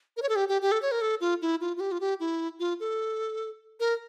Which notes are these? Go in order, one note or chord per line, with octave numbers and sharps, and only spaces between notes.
A#4
C#5
A4
G4
G4
G4
A4
C#5
A#4
A4
F4
E4
F4
F4
G4
F4
G4
E4
F4
A4
A#4